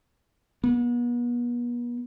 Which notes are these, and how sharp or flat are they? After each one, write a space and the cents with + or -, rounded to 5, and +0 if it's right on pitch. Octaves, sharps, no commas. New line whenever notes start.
B3 -40